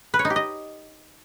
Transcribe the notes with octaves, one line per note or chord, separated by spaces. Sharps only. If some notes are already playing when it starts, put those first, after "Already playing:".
B4
C#5
D#4
G4
D#5